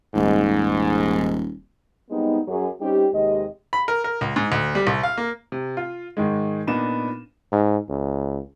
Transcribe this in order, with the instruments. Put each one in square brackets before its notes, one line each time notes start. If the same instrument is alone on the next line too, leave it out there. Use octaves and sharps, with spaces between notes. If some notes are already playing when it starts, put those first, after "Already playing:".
[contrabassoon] D#1 [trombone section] G#2
[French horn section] G3 G#3 B3 C4 D#4
F#2 F#3 G#4
G3 C4 C#4 D#4 G4
D#2 C3 G#3 G4 D#5
[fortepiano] B5
A#4
A#4
C#2
G#2
D2
G3
C2
F5
A#3
[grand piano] C3
F4
G#2 D#3 G#3
A#2 B3 D4 D#4 E7
[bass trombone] G#2
C#2